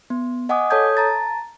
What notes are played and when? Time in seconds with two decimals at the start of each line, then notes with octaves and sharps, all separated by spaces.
0.10 B3
0.49 D#5 F#5 G#5 D6 D#6
0.70 A4 C#5 A5 D#6 G6 G#6
0.97 A5 A#5 A6